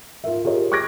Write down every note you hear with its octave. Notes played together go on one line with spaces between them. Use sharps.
F4 A#4 E5
F4 G4 G#4 A#4 C#5 D#5
C#6 D6 F#6 G#6 A#6 D7